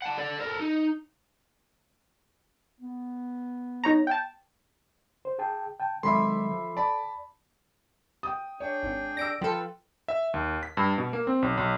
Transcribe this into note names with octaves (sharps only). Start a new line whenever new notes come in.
F#5 A5
A4 D5
A4 A#4
D#4
B3
D#4 C#5 A#5
G5 A5
C5
G#4 G5 A5
G5 A5
D#3 F#3 G#3 A4 E5 B5 C6 D6
F3
D5 A5 B5
G5 D#6
D4 G#4 C#5 G5
G#1
D5 E6 A#6 D7
F3 F4 A4 B4 G5 E6
E5
D#2
B6
G2
B2
A#3
C4
B1
B1